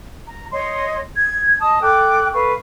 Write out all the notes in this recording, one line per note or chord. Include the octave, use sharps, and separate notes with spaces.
A#5
C#5 D#5 C6
G#6
D#5 A5 D#6
A4 G5 D6 F#6
A4 B4 F5 C#6